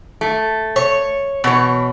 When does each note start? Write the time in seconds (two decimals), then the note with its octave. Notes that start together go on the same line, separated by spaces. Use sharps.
0.21 A3
0.76 C#5
1.44 B2 E3 C#5